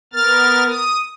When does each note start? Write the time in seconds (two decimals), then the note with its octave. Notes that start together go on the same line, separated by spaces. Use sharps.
0.13 B3 A#4 F6 A6
0.69 D#6